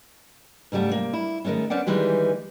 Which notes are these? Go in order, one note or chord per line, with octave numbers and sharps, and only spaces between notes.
G#2 C#3 G3 A3 F#5
C3 A#3
E4
D#3 F#3 G#3 A3 C#4
B3 C#4 C5 D5 F#5
D#3 E3 G3 G#3 B4